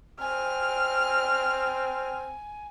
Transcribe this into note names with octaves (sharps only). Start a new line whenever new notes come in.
C4 G#5 F6